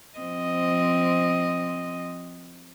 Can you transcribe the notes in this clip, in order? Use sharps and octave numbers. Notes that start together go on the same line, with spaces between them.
F3 C4 D#5